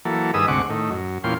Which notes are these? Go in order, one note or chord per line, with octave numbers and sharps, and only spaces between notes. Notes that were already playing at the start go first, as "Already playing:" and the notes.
E3 F#3 A#3 A4
G2 D#3 G#4 B4 D#6 E6
D2 G#2 C3 F#5 C#6 D6
A2 D#3
F#2
E2 A#2 C#4 F4 G5 C6